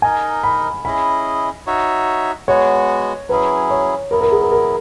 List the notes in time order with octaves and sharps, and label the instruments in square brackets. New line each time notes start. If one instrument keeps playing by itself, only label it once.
[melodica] D#4 A#4 D#5 [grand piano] G#5
[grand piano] B5
[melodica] C#4 E4 G#4 D#5 [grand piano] B5
[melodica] D#4 F#4 C#5 E5
[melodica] G#3 B3 F#4 [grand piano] C#5
[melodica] F#3 C#4 E4 G#4 [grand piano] B4
[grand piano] C#5
[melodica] F#3 B3 E4 [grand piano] A#4
[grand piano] A#4
G#4
A#4
A#4